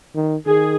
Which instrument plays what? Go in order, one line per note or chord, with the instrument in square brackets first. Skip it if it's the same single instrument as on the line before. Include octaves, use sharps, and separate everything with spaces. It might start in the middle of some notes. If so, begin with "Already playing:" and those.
[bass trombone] D#3
[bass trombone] D#3 [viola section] G#4